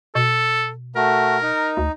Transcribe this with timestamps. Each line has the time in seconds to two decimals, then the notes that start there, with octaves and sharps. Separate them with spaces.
0.15 B2 A4
0.96 A3 F#4 A#4
1.42 D#4
1.77 D2